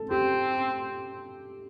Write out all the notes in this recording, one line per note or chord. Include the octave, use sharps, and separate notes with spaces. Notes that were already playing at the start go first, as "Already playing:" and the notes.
Already playing: A4
C4 G4